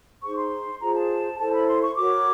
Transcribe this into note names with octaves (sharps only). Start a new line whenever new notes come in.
D#4 G#4 C5 C#6
C6
F4 G#4 C5 A#5
A5
E4 A4 C5 A5
B5
C6
C#6
F#4 A#4 C#5 D6